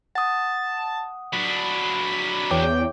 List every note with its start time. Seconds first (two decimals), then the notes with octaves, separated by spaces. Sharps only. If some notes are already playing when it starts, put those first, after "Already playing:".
0.15 F#5 A5 D#6
1.33 F#3 D4 B5
2.51 E2 C#5 G5 D6